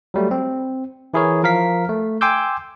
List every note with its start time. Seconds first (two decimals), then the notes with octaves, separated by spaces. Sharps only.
0.14 F#3 G3 A3
0.31 C4
1.14 E3 E4 G#4 A#4 C#5
1.43 F3 A#4 F5 B6
1.89 A3
2.21 G5 G#5 C6 D6 E6 G6